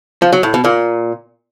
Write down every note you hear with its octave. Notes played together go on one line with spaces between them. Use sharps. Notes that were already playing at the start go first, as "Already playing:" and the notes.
F3
F#3
A2
B2
A#2